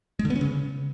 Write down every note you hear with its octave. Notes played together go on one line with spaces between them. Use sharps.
G#3
D3
B3
C#4
C#3